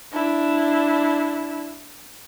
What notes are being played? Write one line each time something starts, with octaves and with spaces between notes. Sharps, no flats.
D4 E4